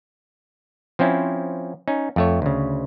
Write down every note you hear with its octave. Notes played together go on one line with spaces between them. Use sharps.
F3 C4 C#4 E4
C#4 D#4
F2 A3 C#5
D2 C#3